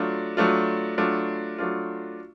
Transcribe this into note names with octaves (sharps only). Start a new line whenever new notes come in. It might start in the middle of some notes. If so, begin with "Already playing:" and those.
Already playing: F#3 A3 D4 F4
F#3 A3 D4 F4
F#3 A3 D4 F4
F#3 A3 D4 F4